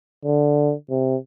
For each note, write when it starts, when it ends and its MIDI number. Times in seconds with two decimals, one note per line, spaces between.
0.25 0.74 50
0.90 1.16 48